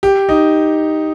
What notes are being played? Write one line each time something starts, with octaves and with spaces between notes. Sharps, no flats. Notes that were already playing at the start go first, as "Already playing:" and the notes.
G4
D#4